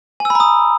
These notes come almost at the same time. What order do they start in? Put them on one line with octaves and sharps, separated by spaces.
G#5 E6 B5 A#5 D#6